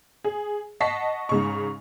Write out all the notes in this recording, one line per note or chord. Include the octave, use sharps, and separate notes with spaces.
G#4
D#5 F#5 A5 C#6 B6 C7
G#2 C#3 C#6